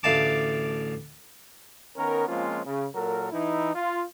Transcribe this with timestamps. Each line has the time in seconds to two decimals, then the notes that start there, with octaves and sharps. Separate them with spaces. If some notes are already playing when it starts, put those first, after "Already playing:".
0.03 A1 D2 F5 A5 D6
1.97 D#3 B3 C#4 A#4
2.28 F3 G#3 A#3 C4 C#4 F4
2.66 C#3
2.95 A#2 F#3 A4 A#4
3.32 E3 D#4 E4
3.75 F4